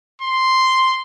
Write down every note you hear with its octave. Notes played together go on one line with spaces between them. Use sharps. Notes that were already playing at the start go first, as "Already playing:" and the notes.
C6